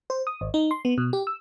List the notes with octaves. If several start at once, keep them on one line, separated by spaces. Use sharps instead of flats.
C5
D#6
G#1
D#4
C6
B3
B2
G4
E6